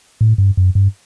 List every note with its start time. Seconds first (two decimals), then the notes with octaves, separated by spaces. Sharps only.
0.21 A2
0.38 G2
0.57 F#2
0.75 G2